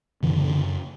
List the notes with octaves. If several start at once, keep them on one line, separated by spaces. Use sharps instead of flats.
F#2 C#3 E3
D3
D3